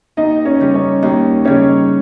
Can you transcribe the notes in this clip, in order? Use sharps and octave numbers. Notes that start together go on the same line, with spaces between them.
D#2 D#4 D#5
C#4 C#5
C#3 G3
C#4 C#5
D#2 D#4 D#5
C#3 G3 C#4 C#5